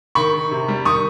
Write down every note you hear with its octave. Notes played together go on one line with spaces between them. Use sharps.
D#3 B5 C#6
D#3
C3
G3
D#3 C#6 D#6